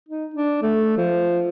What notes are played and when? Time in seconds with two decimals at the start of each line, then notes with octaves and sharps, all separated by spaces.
0.09 D#4
0.34 D4
0.62 A3
0.97 F3